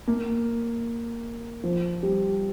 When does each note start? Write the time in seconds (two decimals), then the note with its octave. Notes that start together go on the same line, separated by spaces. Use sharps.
0.07 A#3
1.63 F3
2.03 G3